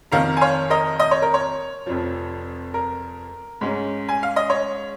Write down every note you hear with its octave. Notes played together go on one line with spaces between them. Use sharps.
F2 D#3 A#3 F5 A#5
G#5
C#5 F5
A#4 D#5
D#5
C#5
A#4
C#5
F1 F2 F3
A#4
G#2 G#3 C#4
G#5
F5
D#5
C#5